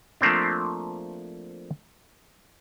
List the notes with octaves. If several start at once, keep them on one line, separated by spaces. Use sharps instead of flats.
F3 A3 A#3 C4 D4